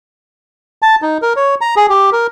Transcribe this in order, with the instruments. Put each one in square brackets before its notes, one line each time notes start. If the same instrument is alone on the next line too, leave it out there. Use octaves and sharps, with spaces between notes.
[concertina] A5
D#4
A#4
C#5
A#5
G#4
G4
A#4